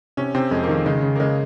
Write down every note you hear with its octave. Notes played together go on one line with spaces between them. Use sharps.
C3 C#4
C3 C4
F2 G#3
A#3
D#3
G#3
C#3 G#3
C#3
A#3
C#3 G#3